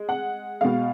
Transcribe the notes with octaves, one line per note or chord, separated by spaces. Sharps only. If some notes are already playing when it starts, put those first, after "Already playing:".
Already playing: G#3
F#5
B2 G#3 F5